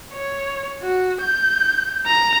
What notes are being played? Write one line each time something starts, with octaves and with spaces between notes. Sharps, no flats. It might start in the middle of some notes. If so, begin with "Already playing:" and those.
C#5
F#4
G6
A#5